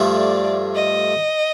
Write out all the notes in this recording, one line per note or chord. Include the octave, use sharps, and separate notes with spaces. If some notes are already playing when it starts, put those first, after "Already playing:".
Already playing: G2 F3 A3
D5
D#5